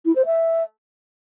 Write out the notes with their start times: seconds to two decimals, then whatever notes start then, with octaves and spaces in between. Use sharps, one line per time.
0.05 E4
0.16 C5
0.26 E5